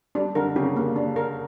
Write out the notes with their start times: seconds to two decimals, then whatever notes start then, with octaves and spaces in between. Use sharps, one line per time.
0.15 G3 D4
0.35 D3 A#4
0.56 C#3 G4
0.76 A#3
0.96 D4
1.16 A#4